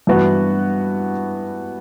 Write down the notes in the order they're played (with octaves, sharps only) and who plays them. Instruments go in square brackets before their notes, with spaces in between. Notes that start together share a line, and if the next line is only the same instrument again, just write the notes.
[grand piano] G2 E3 B3 F#4